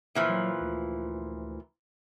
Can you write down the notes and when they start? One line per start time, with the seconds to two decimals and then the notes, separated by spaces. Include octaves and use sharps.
0.15 A#2 E3 F3
0.29 F#3
0.61 D2